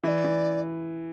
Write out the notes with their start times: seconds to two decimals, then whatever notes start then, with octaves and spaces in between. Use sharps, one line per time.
0.03 E3 D5 E5
0.24 E3